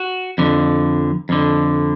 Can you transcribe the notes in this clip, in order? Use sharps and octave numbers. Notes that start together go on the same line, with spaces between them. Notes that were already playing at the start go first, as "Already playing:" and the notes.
Already playing: F#4
F2 D3
F2 D3